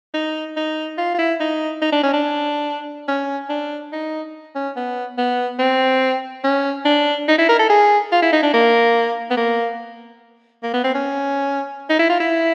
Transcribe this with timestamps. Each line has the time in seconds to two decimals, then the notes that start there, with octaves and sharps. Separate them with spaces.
0.14 D#4
0.57 D#4
0.98 F4
1.15 F4
1.19 E4
1.40 D#4
1.82 D#4
1.92 D4
2.03 C#4
2.14 D4
3.08 C#4
3.50 D4
3.93 D#4
4.56 C#4
4.76 B3
5.18 B3
5.59 C4
6.44 C#4
6.85 D4
7.28 D#4
7.38 E4
7.49 A#4
7.59 A4
7.70 G#4
8.12 F4
8.22 E4
8.33 D#4
8.43 D4
8.54 A#3
9.31 B3
9.37 A#3
10.63 A#3
10.74 B3
10.84 C4
10.95 C#4
11.90 D#4
11.99 E4
12.10 F4
12.20 E4